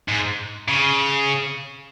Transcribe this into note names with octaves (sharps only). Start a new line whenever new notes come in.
G#2
C#3